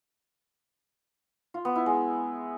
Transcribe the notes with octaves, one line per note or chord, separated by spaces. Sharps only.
F4
B3
E4
G#3